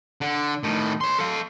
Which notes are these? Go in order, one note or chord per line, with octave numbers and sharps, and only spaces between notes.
D3
A2 D#3
C#5 C6
A4 F5